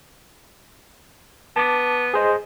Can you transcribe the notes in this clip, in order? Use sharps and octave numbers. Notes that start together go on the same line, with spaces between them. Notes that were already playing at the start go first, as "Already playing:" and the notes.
B3 A5 D6
G#4 C5 D#5